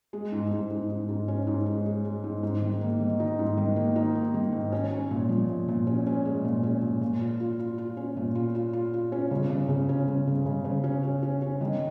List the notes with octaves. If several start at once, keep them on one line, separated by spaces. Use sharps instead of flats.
G#3
G#2
G#2
G#2
G#2
G#2
C#4
G#2
G#3
G#3
G#3
G#2
G#2
D#3
A#3
D#3
D#4
G#2
D#3
A#3
D#4
A#3
D#3
G#2
C#4
C#4
A#2
F3
A#2
A#2
C#4
C#4
G#3
A#2
C#4
A#2
A#2
F4
F4
F4
F4
C#4
A#2
F4
F4
F4
F4
C#4
C#3
C#3
C#3
C#4
C#3
C#3
C#3
C#3
C#4
C#4
C#4
C#4
D#3